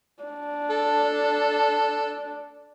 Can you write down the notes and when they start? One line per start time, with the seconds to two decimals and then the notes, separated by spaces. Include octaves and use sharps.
0.24 D4
0.70 A4